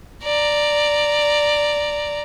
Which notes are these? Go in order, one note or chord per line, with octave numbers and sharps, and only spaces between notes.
D5 A#5